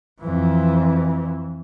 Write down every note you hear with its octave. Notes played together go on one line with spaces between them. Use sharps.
F2 E3